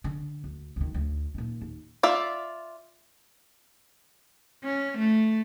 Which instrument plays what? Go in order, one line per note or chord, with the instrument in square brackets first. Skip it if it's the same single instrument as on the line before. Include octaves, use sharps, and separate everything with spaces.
[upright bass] D3
D2
D2 D#3
D2 D3
A#2 D#3
D#2
[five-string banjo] F4 D5 E5
[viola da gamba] C#4
A3